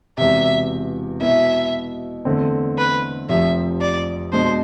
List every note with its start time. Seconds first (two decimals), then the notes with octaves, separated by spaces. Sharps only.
0.18 E1 E2 C3 E5
1.21 B2 B3 E4 E5
2.25 E2 D3 A3 C4
2.78 B4
3.29 F1 F2 C3 F3 E5
3.81 D5
4.33 B2 G#3 D4 C5